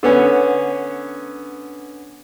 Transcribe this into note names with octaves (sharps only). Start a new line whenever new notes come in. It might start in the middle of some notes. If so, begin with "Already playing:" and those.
D3 B3 C#4